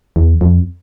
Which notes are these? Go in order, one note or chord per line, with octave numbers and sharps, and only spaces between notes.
E2
F2